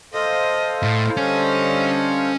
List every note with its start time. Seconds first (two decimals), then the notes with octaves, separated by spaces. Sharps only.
0.14 A4 C5 D#5 F5
0.82 A2
1.17 D3 G3 C#4 D#5